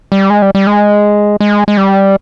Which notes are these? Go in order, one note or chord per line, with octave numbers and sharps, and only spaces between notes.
G3
G#3
G3
G3
G#3
G#3
G#3
G3